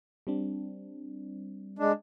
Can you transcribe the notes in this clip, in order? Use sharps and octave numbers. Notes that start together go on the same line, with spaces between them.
G3 C4 D4
G#3 D4